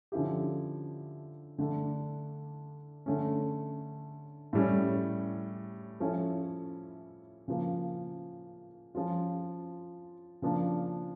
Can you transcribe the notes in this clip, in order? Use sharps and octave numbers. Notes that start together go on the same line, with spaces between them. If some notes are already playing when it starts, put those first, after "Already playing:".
D3 F3 C#4 E4 G4
D3 A3 D4
D3 A3 C#4
A2 G3 C#4
F3 C#4 E4 A4
C#3 F3 A#3
F3 C#4 F4
C#3 F3 A#3 D4